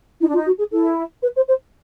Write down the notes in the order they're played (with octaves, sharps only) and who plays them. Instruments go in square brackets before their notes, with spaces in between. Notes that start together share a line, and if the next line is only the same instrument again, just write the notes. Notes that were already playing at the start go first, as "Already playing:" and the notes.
[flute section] D#4 [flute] E4
[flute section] D4
[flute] F4
[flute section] D#4
[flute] F#4
G#4
[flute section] E4 [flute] A4
[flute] B4
C5
C5